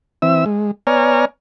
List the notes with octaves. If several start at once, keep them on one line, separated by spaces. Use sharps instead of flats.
E3 C4 E5 E6
G#3
B3 C#5 D5 G#5 A#5 F6